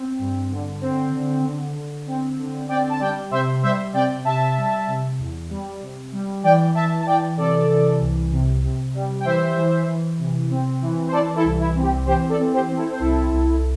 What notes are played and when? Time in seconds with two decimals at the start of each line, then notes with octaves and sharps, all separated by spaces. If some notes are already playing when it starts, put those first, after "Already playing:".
Already playing: C4
0.19 G2
0.51 D3
0.81 C4
1.13 D3
1.44 D3
1.75 D3
2.07 C4
2.38 D3
2.69 C4 D5 G5
2.89 A5
3.00 G3 D5 G5
3.31 C3 C5 E5
3.62 G3 C5 E5
3.93 C3 D5 G5
4.25 C3 E5 A5
4.57 G3
4.87 C3
5.19 E2
5.50 G3
5.81 C3
6.12 G3
6.43 E3 D5 G5
6.74 E3 E5 A5
7.00 A5
7.06 E3 D5 G5
7.37 C3 A4 D5
7.69 E3
8.00 C2
8.31 C3
8.62 C3
8.94 G3
9.20 G5
9.25 E3 C5 E5
9.56 E3
9.87 E3
10.18 C3
10.50 C4
10.81 E3
11.08 C5
11.12 E3 A4 D5
11.36 E4 A4
11.44 C2
11.59 E4
11.75 C4
11.82 G4
12.06 E3 G4 C5
12.29 A4 D5
12.37 C4
12.52 G4 C5
12.68 C4
12.77 E4 A4
12.91 C5
12.99 C2 E4 A4
13.31 C2